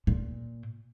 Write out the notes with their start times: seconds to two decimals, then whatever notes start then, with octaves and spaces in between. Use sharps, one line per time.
0.07 A#2